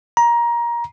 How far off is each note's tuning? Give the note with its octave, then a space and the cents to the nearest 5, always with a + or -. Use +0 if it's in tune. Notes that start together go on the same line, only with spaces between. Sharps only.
A#5 +20